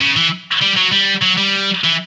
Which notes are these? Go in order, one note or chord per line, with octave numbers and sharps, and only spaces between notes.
C#3
E3
G3
F#3
G3
F#3
G3
E3